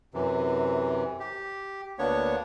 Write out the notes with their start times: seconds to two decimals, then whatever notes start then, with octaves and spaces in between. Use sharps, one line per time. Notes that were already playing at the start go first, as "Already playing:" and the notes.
0.14 F#2 C3 E3
1.20 G4
1.99 D2 A#3 B3 D4 C#5 C#6